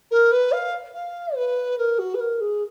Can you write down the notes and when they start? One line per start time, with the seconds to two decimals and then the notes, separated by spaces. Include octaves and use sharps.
0.11 A#4
0.31 B4
0.52 F5
0.94 F5
1.35 B4
1.78 A#4
1.98 F#4
2.14 B4
2.20 A#4
2.40 G#4